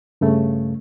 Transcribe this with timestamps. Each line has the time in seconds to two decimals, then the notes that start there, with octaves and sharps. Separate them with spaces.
0.21 G2 C#3 A3